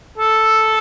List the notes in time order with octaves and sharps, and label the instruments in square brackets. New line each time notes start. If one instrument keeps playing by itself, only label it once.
[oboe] A4